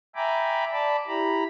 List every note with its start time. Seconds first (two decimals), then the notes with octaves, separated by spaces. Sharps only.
0.15 E5 G5 G#5 A#5 B5 D6
0.72 D5 A5 B5 D6
1.07 E4 G4 A#5 B5